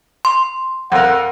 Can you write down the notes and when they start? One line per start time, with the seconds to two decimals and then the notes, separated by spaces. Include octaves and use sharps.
0.25 C6
0.92 F2 A#4 F#5